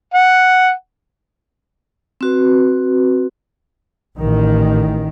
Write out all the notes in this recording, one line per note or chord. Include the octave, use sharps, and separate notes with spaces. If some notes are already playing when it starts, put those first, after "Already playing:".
F#5
C4 F#4 B4
A1 D#3